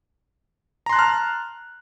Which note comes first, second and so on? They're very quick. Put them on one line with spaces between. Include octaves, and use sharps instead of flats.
A#5 C6 F#6 A5 F6